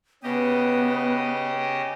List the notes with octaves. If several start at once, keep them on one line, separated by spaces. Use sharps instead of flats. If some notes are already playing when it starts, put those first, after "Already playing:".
C#3 B3 G4 D#5